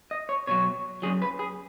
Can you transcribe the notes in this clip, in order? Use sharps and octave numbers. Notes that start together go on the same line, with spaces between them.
D#5
C#5
B2 F#3 C#5
F#2 F#3 G#4
B4
G#4